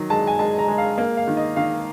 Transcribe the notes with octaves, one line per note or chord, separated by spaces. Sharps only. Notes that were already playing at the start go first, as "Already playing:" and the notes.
Already playing: D#3 F#3
G#3 A5
G#5
G#3 A5
A#5
G#3
F5
A#3
F5
D#3
D#5
D#3 F5